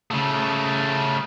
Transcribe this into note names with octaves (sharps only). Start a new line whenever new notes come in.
C#3 A3